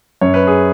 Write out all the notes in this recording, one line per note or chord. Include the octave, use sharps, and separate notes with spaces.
F#2 C#5
B4
G#4